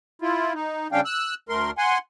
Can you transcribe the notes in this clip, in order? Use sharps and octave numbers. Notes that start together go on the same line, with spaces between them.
E4 F4
D#4
C#3 G3 C#4 D4 F5 G5
E6 F#6
D2 A3 A#4 C6
F#5 G#5 C6